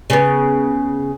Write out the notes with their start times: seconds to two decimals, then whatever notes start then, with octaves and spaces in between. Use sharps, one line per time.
0.10 C#3 B3